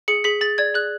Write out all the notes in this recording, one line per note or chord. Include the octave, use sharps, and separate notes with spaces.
G#4 C#7
G#4 B6
G#4 A6
D5 G#6
G#4 F#6